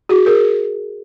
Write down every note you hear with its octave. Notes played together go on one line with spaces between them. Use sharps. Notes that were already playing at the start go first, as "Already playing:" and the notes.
F#4 G#4
G#4 A#4